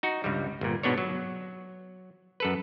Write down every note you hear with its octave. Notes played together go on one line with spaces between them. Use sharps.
D#4 F#4
C#2 G2 G3
G1 A#2
G#2 B2 B3 D4 C#5
F#3
F#2 A4 B4